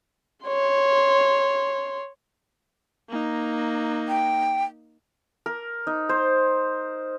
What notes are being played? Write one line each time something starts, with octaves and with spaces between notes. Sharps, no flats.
C#5 C6
A#3 D#4
G5
A#4
D#4
C5